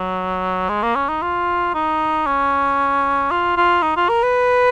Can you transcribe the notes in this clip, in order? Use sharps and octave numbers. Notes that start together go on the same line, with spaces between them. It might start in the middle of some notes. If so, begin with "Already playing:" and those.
Already playing: F#3
G#3
A#3
C#4
D#4
F4
D#4
C#4
F4
F4
D#4
F4
A#4
B4